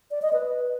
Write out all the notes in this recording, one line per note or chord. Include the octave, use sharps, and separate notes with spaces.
D5
D#5
B4